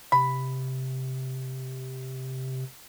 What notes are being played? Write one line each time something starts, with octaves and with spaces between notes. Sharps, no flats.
C3 B5